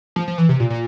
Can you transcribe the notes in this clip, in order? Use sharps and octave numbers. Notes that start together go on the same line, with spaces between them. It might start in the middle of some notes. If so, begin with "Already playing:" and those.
F3
F3
E3
C3
A#2
A#2